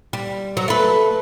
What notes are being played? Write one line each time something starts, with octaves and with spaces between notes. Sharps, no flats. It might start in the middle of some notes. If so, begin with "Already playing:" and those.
G3
F#3
A3 B4